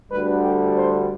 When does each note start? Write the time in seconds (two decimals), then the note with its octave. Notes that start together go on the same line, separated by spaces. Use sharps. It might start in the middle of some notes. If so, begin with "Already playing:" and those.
0.11 D2 D3 G3 B4
0.44 G4
0.76 C5